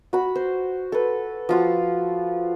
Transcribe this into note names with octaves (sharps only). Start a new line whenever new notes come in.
F#4 B5
C5
A4 B4
F3 F4 F#4